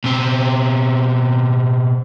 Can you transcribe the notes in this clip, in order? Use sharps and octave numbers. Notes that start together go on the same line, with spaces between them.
B2 C4